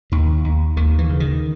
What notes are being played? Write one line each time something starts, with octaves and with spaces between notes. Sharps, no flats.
D#2 D#3
D#2
D#2 D#3
E3
C#3
D#3